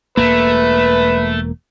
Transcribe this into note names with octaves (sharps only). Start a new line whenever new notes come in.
E1 E2 A3 A#3 B4